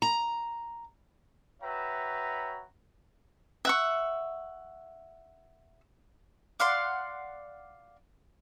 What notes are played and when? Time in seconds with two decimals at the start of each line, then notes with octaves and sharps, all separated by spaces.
0.02 A#5
1.62 F#4 B4 C#5 E5 G5 A#5
3.65 E5 F#5 C#6
6.60 D5 F5 F#5 C6